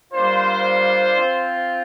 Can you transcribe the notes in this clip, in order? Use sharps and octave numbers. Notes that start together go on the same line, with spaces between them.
G3 A#3 D4 F4 C5
C4 F4